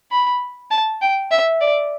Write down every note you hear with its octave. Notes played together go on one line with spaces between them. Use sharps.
B5
A5
G5
E5
D5